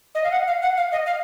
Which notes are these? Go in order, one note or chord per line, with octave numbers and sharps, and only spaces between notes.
D#5
F5
F#5
F5
F#5
F5
D#5
F5